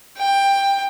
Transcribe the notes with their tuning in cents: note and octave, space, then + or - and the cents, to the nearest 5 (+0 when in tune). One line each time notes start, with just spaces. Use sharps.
G5 +15